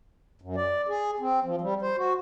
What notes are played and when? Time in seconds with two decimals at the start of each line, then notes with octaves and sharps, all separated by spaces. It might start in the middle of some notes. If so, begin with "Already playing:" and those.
0.42 F#2
0.56 D5
0.88 G#4
1.20 C4
1.44 F3
1.61 G3
1.82 C5
1.97 F#4